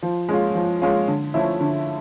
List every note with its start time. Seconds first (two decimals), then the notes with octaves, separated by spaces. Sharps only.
0.03 F3
0.29 G#3 C#4 F4
0.55 F3
0.82 G#3 C#4 F4
1.08 D3
1.34 F3 A3 C#4 E4
1.60 D3